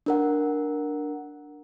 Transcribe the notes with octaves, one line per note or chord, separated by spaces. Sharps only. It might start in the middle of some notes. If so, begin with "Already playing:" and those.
D4 A#4 F#5